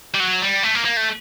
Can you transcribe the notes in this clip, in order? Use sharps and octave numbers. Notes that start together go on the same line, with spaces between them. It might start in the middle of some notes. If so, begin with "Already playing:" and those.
G3
F#3
G3
A3
A#3
A#3
A3